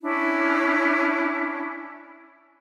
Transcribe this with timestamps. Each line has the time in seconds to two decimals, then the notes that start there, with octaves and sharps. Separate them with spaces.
0.01 C#4 D4 E4